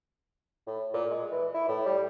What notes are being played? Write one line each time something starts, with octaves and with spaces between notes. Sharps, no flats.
A2
A#2
G#3
E3
E4
A2
G3